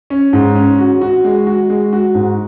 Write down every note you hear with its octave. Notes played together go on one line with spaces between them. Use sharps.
C#4
G#2
C#4
F#4
F#4
G#3
F#4
G#3
F#4
G#2